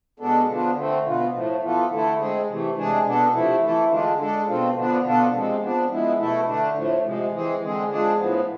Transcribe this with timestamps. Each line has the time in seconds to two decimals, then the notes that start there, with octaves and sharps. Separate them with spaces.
0.19 B2 G#3 B3 D4 A4
0.47 D3 F3 B3 D4 F4
0.76 D3 A3 C4
1.05 B2 B3 F4
1.34 A2 F3 A3
1.62 E3 B3 F4 A4
1.90 D3 A3 E4 A4
2.19 G#3 C4 G#4
2.47 C3 E3 A3
2.76 C3 G#3 D4 G#4
3.04 B2 B3 D4 A4
3.33 C3 F3 A3 E4
3.62 E3 A3 E4 A4
3.90 D3 G#3 D4 F4
4.19 G#3 D4 A4
4.47 B2 A3 C4 F4
4.75 D3 F3 B3 D4
5.04 B2 B3 D4 F4 A4
5.33 C3 F3 G#3 C4
5.62 F3 B3 D4
5.90 F3 G#3 B3 E4
6.18 B2 A3 E4 A4
6.47 D3 A3 D4
6.75 A2 F3 A3
7.04 C3 F3 G#3
7.32 E3 G#3 C4 G#4
7.61 D3 G#3 C4 G#4
7.89 F3 G#3 D4 G#4
8.18 A2 F3 B3